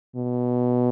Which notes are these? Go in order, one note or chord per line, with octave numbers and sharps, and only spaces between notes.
B2